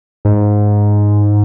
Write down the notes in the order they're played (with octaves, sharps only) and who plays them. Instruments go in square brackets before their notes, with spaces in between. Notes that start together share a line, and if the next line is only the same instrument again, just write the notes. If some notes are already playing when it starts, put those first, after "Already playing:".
[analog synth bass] G#2